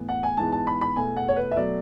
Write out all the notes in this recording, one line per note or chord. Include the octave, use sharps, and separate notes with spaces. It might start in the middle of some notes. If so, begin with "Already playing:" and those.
Already playing: A2 E3 B3
F#5
G#5
G#2 E3 G#3 B3 A5
A5
B5
B5
E2 B2 A3 G#5
F#5
C#5
B4
E5
B2 F#3 A3 D5